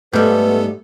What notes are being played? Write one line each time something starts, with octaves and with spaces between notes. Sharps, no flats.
G#2 G3 A3 B3 A4 B4